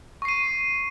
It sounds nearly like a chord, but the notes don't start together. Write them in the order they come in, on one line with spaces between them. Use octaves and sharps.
C#6 C7 D#7